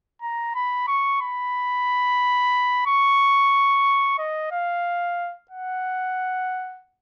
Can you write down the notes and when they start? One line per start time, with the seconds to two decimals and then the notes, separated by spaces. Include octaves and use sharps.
0.22 A#5
0.55 B5
0.88 C#6
1.21 B5
2.87 C#6
4.18 D#5
4.52 F5
5.51 F#5